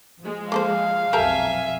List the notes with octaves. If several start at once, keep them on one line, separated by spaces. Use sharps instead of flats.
F3 G#3
A#3 A4 C5 F5
B1 F2 G4 A4 A#4 E5 G#5